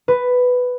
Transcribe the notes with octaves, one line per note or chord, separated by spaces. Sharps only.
B4